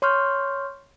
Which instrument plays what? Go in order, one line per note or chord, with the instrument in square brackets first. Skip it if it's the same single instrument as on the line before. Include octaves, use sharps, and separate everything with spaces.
[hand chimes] C#5 C6 C#6 F6 G6